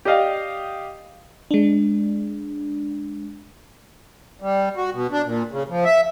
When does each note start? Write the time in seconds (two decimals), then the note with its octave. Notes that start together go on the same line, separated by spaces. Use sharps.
0.05 G4 D5 D#5 F5
1.51 G#3 D4
4.42 G3
4.77 F#4
4.93 B2
5.12 D4
5.25 A#2
5.52 C#3
5.69 F3
5.85 E5